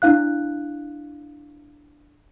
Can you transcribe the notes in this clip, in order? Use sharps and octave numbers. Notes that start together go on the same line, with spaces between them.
D4 E4 F5 F#6